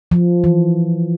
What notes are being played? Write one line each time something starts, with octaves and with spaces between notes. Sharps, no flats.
F3
E3